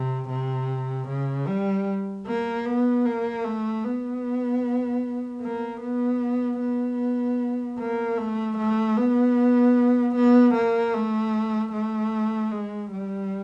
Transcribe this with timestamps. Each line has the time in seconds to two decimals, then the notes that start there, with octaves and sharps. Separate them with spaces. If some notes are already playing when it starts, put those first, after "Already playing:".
Already playing: C3
0.29 C3
1.08 C#3
1.47 G3
2.27 A#3
2.65 B3
3.05 A#3
3.44 A3
3.84 B3
5.41 A#3
5.81 B3
6.60 B3
7.79 A#3
8.17 A3
8.58 A3
8.97 B3
10.15 B3
10.55 A#3
10.94 A3
11.73 A3
12.51 G#3
12.91 G3